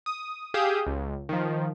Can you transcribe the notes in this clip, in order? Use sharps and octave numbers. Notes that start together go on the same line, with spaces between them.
D#6
G4 G#4 F5 D#6 E6 G6
C#2
D#3 F3